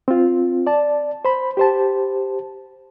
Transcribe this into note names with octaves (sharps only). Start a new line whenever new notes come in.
C4 F4
D5 A5
C5 B5
G4 C5 A5